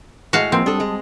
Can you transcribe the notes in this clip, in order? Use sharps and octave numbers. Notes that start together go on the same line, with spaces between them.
A2 G#3 F#4 F5
F3 A#3 C4
G3 D4 A4 A5 D#6
G#3